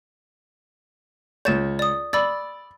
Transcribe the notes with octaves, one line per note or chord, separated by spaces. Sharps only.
C#2 C#5 G6 A6 E7
D5 D#6
D5 B5 E6 A6